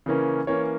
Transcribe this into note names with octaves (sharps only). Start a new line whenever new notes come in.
C#3 E3 A#3 C#4
E3 A#3 C#4 C#5